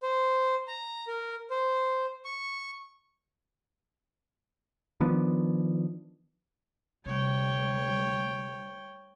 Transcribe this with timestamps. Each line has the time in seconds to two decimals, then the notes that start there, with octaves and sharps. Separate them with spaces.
0.03 C5
0.68 A#5
1.08 A#4
1.50 C5
2.25 C#6
5.00 D#3 F3 B3 D4
7.06 D2 C3 G3 C#5 G5